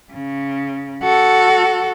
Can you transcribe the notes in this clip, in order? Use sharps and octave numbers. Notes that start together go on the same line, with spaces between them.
C#3
F#4 A4